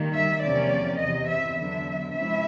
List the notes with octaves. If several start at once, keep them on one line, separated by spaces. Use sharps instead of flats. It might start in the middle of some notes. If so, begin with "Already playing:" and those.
Already playing: D#3 G3 A#3
E5
E2 C3 F3 A#3 C#4 D5
E2 C3 E3 D#5
E5
D3 F#3 B3 D4 E5
C3 F3 G#3 C#4 E4 E5